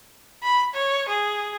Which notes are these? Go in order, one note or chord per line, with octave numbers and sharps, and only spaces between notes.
B5
C#5
G#4